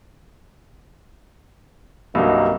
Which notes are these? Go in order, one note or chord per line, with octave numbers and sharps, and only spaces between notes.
C2 G2 F#3 A#3 C4 D#4